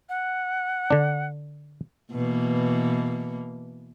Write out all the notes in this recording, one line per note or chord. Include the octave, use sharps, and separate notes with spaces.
F#5
D3 D4
B2 E3 A#3